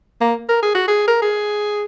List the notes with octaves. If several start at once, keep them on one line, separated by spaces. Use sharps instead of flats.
A#3
A#4
G#4
F#4
G#4
A#4
G#4